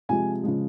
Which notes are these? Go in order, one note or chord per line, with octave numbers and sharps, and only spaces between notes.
C3 F3 G#3 G#5
C#3 F3 G#3